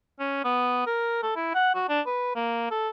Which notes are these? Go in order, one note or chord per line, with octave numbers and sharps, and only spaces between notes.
C#4
B3
A#4
A4
E4
F#5
F#4
D4
B4
A#3
A4